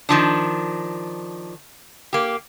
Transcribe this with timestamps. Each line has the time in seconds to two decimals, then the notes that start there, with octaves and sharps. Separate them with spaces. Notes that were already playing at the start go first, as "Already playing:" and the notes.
0.09 D#3 F3 D4
2.13 A#3 G4